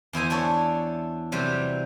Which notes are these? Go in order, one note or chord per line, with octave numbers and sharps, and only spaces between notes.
E2 E4 C5 G#5
D4 E4 A4 C#5
C3 E3 F#3 G3 G4 C5